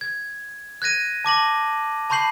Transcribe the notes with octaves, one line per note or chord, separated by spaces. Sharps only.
G#6
F#6 G#6 A#6 D#7
A5 D6 A#6 F#7
A5 B5 C#6 G6 C7 F#7